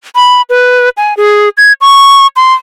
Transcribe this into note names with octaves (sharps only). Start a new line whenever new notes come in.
B5
B4
G#5
G#4
G#6
C#6
C6